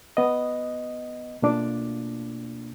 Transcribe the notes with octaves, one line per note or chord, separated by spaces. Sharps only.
B3 D#5
B2 A3 A#3 D4 F4 D6